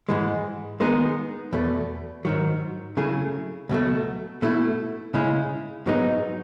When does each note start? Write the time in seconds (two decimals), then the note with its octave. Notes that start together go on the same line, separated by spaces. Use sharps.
0.09 G#2 E3 G#3
0.80 D#3 G#3 B3 D#4 G#4
1.53 E2 B2 A3
2.25 G#2 D#3 F#3
2.97 C#3 F#3 A3 E4 G#4
3.69 C#2 B2 F#3 A3
4.42 B2 A3 E4
5.14 C#3 G#3 C#4 E4
5.87 G#2 F#3 B3 D#4 G#4